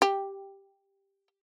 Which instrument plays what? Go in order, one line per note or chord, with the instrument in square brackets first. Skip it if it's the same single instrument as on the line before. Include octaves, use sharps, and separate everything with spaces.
[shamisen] G4